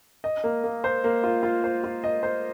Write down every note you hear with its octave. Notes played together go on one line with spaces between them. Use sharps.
D#5
A#3
A#3
C5
A#3
F4
F4
C5
F4
D#5
C5